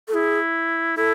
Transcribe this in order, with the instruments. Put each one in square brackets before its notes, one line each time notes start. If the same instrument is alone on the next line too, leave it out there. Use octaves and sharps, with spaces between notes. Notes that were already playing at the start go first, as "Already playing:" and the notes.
[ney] A4
[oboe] E4 [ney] G#4
[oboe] E4 [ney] A4